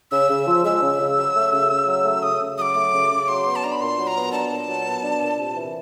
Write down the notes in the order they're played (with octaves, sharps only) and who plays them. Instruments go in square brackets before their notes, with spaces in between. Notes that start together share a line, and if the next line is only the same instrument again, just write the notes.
[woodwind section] C#3 [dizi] E6
[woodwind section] C#3
F3
[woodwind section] G#3 [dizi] E6
[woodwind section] C#3
C#3
F#3
A3
C#3
C#3
F#3
A3
[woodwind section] C#3 [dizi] D#6
[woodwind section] C#3
[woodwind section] F#3 [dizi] D6 D#6
[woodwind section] A3
C#3
C#3
[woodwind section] F#3 [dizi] C6
[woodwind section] B3
[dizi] A5
[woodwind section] D4 [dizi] A#5
[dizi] B5
[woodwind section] A#2 [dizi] C6
[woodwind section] F#3
[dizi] A#5
[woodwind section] B3
[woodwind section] D4 [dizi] A5
[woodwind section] A#2
F#3
B3
D4
A#2
C3
E3